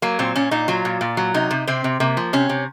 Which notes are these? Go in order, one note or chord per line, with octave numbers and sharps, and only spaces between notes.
F#3 A#3
A#2 C4
A#2 C#4
A#2 D#4
F#3 F4
A#2
A#2
F#3
C3 D#4
C3
C3 C4
C3
C3 A#3
F3
C3 C#4
C3